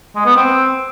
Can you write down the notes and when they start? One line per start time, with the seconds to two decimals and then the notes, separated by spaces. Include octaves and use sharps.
0.15 G#3
0.26 B3
0.36 C4